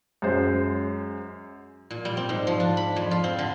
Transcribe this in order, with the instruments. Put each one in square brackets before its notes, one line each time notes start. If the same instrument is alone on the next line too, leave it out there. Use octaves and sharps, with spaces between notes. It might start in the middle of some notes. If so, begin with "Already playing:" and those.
[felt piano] F#2 G#3 C5
[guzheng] A#2
G3
C4
G#2
F3
D4
B5
F2
F4
C4
D3